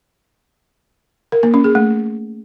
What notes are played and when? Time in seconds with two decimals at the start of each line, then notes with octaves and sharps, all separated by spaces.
1.32 A#4
1.43 A#3
1.54 C#4
1.64 G#4
1.75 A3